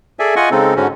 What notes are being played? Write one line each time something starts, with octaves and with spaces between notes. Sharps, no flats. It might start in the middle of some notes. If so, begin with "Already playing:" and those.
G#4 A4 D5 E5 G#5
F4 D#5 F#5 G#5 C#6
C#3 G#3 C4 D#4 A4
G#2 D3 C#4 F#4